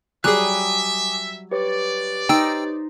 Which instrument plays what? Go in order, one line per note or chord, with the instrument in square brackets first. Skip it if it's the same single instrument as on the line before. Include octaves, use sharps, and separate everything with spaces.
[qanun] F#3 G3 [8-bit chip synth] G#4 F#6 [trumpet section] E5 [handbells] G#5 D6 D#6
[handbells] G4 B4 C#5 [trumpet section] D5
[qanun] D#4 C5 [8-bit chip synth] G5 E6